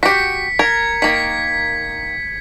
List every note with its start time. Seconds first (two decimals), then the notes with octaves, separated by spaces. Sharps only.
0.03 F#4 G4 B6 C#7
0.59 A#4 G#6
1.02 D#3 A#3 B6